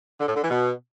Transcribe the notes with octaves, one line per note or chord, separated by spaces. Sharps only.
D3
A2
D3
E3
B2